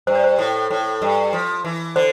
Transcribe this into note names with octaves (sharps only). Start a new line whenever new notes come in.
G2 C5
D5
C5
A2
A2
G2
F3
E3
D3 C5